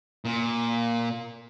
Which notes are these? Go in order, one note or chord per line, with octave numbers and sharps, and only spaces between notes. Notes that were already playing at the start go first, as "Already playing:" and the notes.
A#2